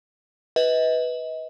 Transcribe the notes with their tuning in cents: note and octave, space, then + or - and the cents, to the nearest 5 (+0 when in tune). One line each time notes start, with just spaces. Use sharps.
B4 +0 D#5 +35